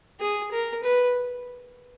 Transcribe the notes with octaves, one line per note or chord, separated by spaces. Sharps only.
G#4
A#4
B4